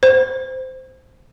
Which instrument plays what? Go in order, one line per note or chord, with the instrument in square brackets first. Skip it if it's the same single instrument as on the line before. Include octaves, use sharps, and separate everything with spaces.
[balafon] C5